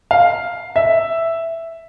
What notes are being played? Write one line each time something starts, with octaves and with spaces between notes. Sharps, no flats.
F5
E5